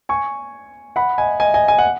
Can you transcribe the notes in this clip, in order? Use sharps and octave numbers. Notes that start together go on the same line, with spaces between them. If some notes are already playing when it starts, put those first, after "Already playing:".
G#5 C#6
F#5 B5
D#5 G#5
D#5 G#5
D#5 G#5
G#5
F#5